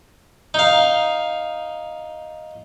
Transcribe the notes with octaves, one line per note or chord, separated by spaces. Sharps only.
D#4 F5